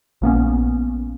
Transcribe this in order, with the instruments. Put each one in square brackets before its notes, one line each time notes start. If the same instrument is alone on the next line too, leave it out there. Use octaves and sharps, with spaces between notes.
[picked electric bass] A#1 A#3 B3 C#4